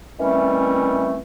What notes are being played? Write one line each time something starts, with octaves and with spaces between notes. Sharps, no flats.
D#3 E3 G3 A3 C4 C#4